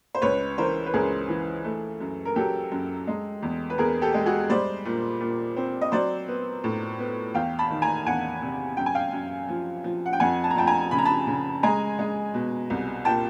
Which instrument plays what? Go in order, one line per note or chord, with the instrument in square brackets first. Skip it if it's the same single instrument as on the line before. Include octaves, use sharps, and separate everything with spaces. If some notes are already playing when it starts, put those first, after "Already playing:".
[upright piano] C5
C#2 B4 C#5
E3 A#4 C5
B4
C#2 G#4 A#4
E3
A3
F#2
A#4
F#3 G4 A4
F#2
G#3
E2
B4
E2 G#4 A#4
G4 A4
G#3
F#4 G#4
G3 C5 D5
A#2
A#2
C4
D#5
F#3 C5 D5
B3
A2
B3
E2 F5 G5
A5 B5
D#3
G#5 A#5
E2 F#5 G#5
C3
F#2 G5
G#5
F5 G5
F#2
F3
F3
F#5
G5
F2 F#5 G#5
A5
A#5
F2 G5 A5
G#5 A#5
C#3 B5
A#5
A5 B5
C#3
G#3 G#5 A#5
G#3
B2
C2
A#2 G5 A5